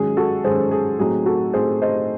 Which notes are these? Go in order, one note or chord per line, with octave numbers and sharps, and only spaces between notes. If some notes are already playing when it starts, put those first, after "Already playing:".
Already playing: G#2 D#3 F#3 C#4 G#4
F#4 A4
G#2 D#3 F#3 C#4 G#4 C5
G#4
A2 F#3 C4 D#4 G#4
F#4 A4
A2 F#3 C4 D#4 G#4 C5
C5 D#5